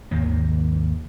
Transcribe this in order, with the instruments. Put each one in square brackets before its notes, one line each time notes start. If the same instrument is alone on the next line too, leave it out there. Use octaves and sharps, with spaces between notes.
[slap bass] G#1 D#2 D#3 A#3